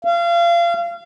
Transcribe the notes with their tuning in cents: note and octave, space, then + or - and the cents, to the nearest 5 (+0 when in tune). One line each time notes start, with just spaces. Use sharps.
F5 -30